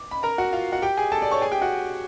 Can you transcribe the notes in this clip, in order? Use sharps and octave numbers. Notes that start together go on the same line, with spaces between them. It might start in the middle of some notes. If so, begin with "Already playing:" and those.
Already playing: D6
B5
A#4 A#5
F#4 F#5
F4 F5
F#4 F#5
G4 G5
G#4 G#5
A4 A5
D5 D6
C#5 C#6
G#4 G#5
G4 G5
F#4 F#5